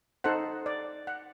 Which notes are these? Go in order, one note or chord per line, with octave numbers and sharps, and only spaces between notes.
D#4 A4 C5 F#5
D5
F#5